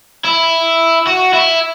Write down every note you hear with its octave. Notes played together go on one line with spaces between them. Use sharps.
E4
F#4
E4